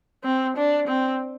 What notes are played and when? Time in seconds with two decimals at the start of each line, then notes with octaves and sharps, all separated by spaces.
0.24 C4
0.57 D4
0.88 C4